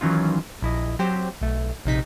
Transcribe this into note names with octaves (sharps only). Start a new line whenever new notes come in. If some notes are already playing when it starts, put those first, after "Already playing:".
D#3 E3 F#3 C#4 D#4 F4
A#1 E4 D#5
F#3 C4 G4 C5
B1 A3
A#1 C3 D#4 B6